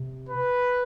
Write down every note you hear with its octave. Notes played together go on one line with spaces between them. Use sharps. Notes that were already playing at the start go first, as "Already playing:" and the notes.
Already playing: C3
B4